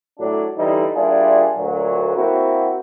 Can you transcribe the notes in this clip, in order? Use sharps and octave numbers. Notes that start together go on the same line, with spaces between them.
A2 F#3 D4
D3 E3 G3 D#4
A#2 G3 D4 E4 F4 G#4
D2 A#2 F#3
A#3 C4 E4 F#4